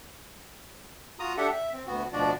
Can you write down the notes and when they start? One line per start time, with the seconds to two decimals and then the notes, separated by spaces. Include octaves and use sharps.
1.19 F4 F#4 A#5 D#6
1.37 D4 G4 A4 E5 F#5
1.52 E5
1.73 C4
1.87 D2 B3 F#4
2.13 D2 B2 F3 D4 F#4 D5